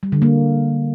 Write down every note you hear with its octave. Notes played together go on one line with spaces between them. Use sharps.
G3
D3
A#3